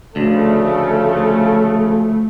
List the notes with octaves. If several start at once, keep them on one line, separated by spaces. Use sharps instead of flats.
D2 C#3 F3 A3 A4